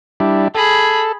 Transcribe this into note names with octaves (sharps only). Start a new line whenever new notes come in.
G3 D4 E4
G#4 A4 B5